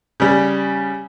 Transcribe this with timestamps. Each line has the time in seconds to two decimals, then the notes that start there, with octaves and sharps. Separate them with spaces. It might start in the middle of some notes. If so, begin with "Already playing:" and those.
0.20 C#3 G3